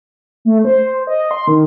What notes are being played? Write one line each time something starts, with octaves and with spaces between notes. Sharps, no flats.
A3
C5
D#5
C6
D#3